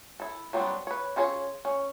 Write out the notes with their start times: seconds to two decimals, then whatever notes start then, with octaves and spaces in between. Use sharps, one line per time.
0.20 E4 A4
0.53 F#3 G3 B3 C4 D4
0.87 B4 C#5
1.16 C#4 F4 G#4 A4 C#5
1.65 C#4